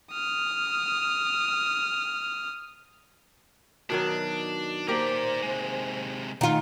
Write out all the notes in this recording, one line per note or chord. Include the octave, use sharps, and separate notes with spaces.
D#6 F6
B2 D#3 F#3 D4
A#3 G4 A#4 C5 D5
C3 G#3
D#3 A3 F4